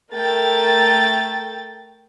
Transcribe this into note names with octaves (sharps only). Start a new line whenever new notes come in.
A3 A#4 G5 A6